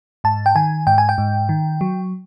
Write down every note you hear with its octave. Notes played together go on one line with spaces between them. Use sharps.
G#2 A5
G5
D#3 G#5
G#2 G5
G#5
G5
G#2
D#3
F#3